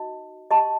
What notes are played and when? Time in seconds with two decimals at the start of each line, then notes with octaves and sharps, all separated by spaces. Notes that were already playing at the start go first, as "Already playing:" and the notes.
Already playing: D#4 F#4 D#5
0.51 G4 D#5 A5 C6